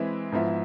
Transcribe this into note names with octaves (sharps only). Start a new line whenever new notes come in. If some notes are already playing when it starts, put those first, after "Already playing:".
Already playing: E3 G#3 C4 E4 B4
G#2 F3 B3 E4